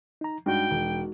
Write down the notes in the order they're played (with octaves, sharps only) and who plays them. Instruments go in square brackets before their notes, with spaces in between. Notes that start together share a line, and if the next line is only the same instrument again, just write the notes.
[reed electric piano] D#4 A#5
[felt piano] G2 [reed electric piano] G#3 D#4 F#4 [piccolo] G5
[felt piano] E1